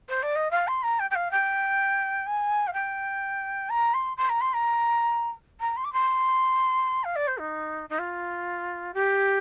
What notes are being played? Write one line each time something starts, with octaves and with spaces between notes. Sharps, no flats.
C5
D5
D#5
F5
C6
A#5
G5
G5
F5
G5
G#5
F5
G5
A#5
C6
C6
A#5
C6
A#5
A#5
C6
D6
C6
F5
D5
C5
D#4
D#4
F4
G4